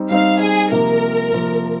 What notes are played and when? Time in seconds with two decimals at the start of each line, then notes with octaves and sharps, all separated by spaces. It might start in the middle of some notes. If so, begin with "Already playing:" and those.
Already playing: G3 C4 D#4
0.11 G3 C4 D#4 F5
0.41 G#4
0.72 C3 F3 A#3 A#4
1.33 C3 F3 A#3